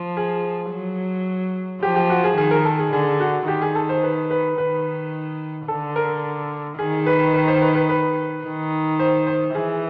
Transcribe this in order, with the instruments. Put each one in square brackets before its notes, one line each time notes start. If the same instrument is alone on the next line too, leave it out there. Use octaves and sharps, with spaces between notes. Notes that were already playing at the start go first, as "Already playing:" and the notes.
Already playing: [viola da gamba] F3
[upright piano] G#4
[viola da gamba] F#3
[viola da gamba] F3 [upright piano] G4
[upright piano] G4
F#4
G#4
[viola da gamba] D#3 [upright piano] G#4
[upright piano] A#4
A4
G#4
[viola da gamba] D3 [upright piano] G#4
[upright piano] F#4
[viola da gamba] D#3 [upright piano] G4
[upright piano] G#4
A4
C5
B4
B4
[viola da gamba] D#3 [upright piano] B4
[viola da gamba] D3 [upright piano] A4
[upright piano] A#4
[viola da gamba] D#3 [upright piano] G#4
[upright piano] B4
B4
C5
B4
B4
B4
[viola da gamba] D#3
[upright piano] C5
C5
[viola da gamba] E3 [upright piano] G#4